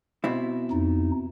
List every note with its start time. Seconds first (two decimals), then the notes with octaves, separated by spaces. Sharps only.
0.24 B2 C4 E4
0.71 F2 D#4